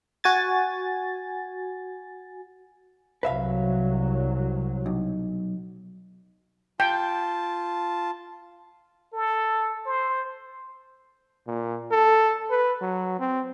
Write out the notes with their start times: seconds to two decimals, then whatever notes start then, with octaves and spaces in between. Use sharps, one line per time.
0.24 F#4 G#5 A6
3.23 C2 F#3 B4 E5 F5
4.86 B1
6.80 F4 G5 A5
9.13 A4
9.86 C5
11.47 A#2
11.91 A4
12.50 B4
12.82 F#3
13.19 C4